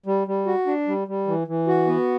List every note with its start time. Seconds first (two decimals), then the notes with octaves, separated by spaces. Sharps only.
0.06 G3
0.27 G3
0.47 F#4
0.67 D4
0.88 G3
1.08 G3
1.27 E3
1.47 E3
1.67 F#4
1.87 B3